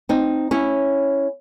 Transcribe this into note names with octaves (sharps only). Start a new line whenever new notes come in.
C4 D#4
C#4 E4